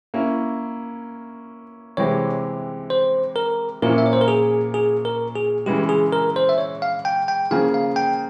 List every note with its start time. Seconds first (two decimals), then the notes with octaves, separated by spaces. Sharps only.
0.14 A#3 C#4 E4
1.97 C3 E3 G#3 C4 G4 C#5
2.90 C5
3.36 A#4
3.82 A#2 F3 A#3 C#4 E4 A#4
3.98 E5
4.06 C#5
4.13 C5
4.21 A#4
4.28 G#4
4.74 G#4
5.05 A#4
5.35 G#4
5.66 C#3 E3 G#3 G4
5.89 G#4
6.13 A#4
6.36 C5
6.49 E5
6.58 C#5
6.82 F5
7.05 G5
7.28 G5
7.51 C#3 F3 A#3 F4 G#4 F5
7.74 F5
7.96 G5